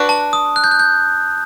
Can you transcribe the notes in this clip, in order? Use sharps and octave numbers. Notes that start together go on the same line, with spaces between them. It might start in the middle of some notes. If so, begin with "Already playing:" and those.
Already playing: D4 F#4 B4
A5
D#6
F#6
G6
F#6
G6